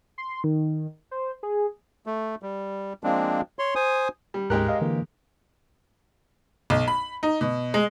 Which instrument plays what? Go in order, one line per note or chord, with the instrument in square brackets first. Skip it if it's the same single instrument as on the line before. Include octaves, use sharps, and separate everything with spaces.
[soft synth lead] C6
D#3
C5
G#4
[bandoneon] A3
G3
F3 G#3 A#3 C4 D4
C#5 C6
C5 G#5 D#6
[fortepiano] G3
[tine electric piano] D2 G#2 F#6 [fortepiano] G#3 G4 A#4
[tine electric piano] D#5 F5
D3 E3 A#3
[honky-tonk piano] B1
B5
D#4
B2
G#3